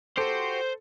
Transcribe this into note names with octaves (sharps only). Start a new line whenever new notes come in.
F#4 G4 A4 C5